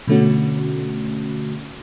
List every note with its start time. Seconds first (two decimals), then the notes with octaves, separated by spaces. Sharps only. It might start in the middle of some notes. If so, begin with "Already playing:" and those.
0.07 B2 D3 A3 C#4 F#4